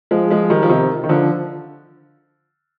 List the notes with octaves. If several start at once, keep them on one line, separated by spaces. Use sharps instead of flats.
F3 G#3
F3 G#3
D#3 G3
F3
C3 D#3
D#3
D3 F3